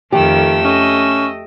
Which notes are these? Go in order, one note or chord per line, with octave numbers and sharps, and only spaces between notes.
F2 D#3 A3 G4 E6
C#4 D#5